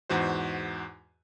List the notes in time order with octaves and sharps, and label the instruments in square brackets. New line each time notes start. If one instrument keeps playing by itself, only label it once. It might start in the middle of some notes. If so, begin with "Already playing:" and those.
[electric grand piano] E2 G#2 F#4 C5